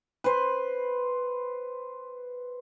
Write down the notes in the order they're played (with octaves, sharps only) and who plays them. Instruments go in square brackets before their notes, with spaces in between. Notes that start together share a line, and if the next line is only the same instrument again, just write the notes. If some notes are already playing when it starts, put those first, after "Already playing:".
[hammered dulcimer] B4 C5